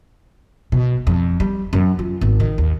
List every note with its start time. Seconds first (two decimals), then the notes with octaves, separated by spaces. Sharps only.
0.72 B2
1.07 F2
1.40 G3
1.73 F#2
1.99 F4
2.21 G#1
2.40 D#3
2.58 D#2